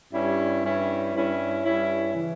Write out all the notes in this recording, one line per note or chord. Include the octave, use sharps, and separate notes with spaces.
G2 G3 C#4 E4
G2 G3 C#4 E4
G2 G3 C#4 E4
G2 G3 C#4 E4
C#3 E3